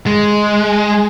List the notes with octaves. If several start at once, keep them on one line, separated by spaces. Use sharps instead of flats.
G#3